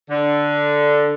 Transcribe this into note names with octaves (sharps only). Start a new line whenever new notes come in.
D3